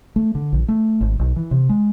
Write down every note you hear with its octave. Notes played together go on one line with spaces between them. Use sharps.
A3
D3
A#1
A3
G#1
B1
E3
C3
G#3